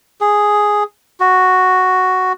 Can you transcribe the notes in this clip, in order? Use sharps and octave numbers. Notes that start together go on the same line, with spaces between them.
G#4
F#4